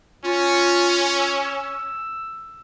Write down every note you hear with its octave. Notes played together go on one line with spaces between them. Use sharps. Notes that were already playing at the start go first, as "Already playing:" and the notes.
C#4 F4
E6